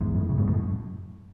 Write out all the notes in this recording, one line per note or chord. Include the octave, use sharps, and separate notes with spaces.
E2 G#2
F#2 A2
A2 C#3
G#2 B2
F#2 A2